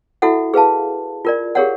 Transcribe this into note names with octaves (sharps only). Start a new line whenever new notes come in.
E4 F#4 A4 E5 F#5
G#4 B4 F5 A5
F4 A#4 D5
G4 G#4 A#4 C#5 F5 F#5